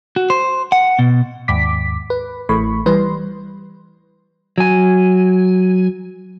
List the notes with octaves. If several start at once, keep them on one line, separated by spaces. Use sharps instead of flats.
F#4
C5
F#5
B2
D#2 G#2 D6 B6
B4
A1 E3 A3 B5 C#6
E3 G3 B4 C6
F#3 G#5